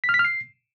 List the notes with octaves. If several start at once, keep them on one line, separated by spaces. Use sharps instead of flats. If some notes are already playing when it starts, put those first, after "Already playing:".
B6
F6
B6
F6
C7